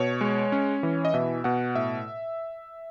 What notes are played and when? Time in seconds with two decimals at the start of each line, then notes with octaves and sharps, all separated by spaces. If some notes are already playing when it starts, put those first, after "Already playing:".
Already playing: B2 C#5
0.21 G#3
0.52 C#4
0.83 E3
1.05 D#5
1.14 B2 E5
1.44 B2 F#5
1.75 A2 E5